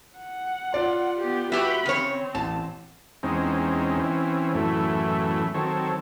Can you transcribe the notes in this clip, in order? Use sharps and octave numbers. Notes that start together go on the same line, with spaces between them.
F#5
F4 D5 C6
B3 G4
F#4 G4 B4 E5 B5
C#3 C4 C#5
A1 A5
E2 G#3 C4 C#4 D#4
E3 C4 C#4
F#2 A2 E3 A3
D#3 F#3 C4 A4 C#5